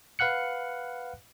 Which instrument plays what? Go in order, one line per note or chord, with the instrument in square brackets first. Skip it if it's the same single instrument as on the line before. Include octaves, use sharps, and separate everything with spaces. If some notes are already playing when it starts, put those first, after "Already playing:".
[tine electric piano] B4 F5 F#5 F#6 C#7